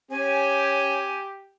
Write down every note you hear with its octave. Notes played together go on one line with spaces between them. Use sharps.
C#4 G4 G#5